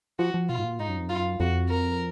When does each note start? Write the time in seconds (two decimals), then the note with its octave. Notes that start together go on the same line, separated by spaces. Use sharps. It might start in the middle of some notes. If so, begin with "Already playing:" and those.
0.19 F3 F#4
0.34 F3
0.49 B2 F4
0.58 G#2
0.64 A#2
0.79 G#2 D#4
0.89 F#2
0.98 F2
1.08 F#2 F4
1.40 F2 F#4
1.69 A#4